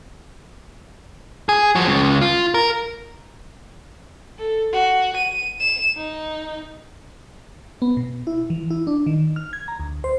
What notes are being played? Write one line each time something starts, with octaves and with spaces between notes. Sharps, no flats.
G#4
F3 F#4
C#2 C#3
F4
A#4
A4
F#4
D#7
E7
D#4
B3
B2
E4
E3
E4
D4
D#3
F6
G#6
A#5
D2
C5